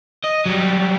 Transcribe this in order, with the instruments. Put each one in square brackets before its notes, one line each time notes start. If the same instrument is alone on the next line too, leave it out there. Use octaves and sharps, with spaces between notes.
[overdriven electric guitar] D#5
F#3 G3